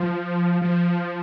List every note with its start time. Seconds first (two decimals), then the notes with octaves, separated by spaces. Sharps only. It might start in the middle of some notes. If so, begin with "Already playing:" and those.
Already playing: F3
0.62 F3